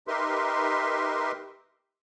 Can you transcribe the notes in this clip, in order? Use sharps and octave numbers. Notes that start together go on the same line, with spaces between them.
D#4 G4 A#4 B4 E5 C6